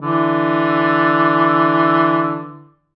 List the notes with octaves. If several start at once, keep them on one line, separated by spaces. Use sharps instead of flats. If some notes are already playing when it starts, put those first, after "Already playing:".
D3 E3